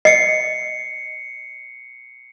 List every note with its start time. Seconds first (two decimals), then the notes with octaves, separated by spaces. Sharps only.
0.05 D#5 C7 C#7